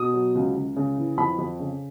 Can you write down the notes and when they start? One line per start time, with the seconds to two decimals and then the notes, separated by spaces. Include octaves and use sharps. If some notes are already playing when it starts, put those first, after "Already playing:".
Already playing: B2 D#6
0.14 F#3
0.35 C#2
0.56 C#2
0.76 C#3
0.98 E3
1.18 F2 B5
1.39 F2
1.59 C#3